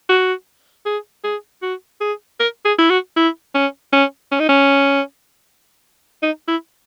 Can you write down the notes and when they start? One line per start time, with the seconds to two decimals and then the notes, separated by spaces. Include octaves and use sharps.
0.10 F#4
0.86 G#4
1.24 G#4
1.63 F#4
2.01 G#4
2.40 A#4
2.65 G#4
2.78 E4
2.90 F#4
3.17 E4
3.55 C#4
3.93 C#4
4.31 C#4
4.40 D#4
4.49 C#4
6.23 D#4
6.48 E4